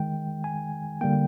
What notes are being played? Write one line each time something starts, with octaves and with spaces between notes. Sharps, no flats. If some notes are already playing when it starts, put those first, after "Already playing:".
Already playing: D#3 G#3 G5
G#5
D3 G3 A#3 G5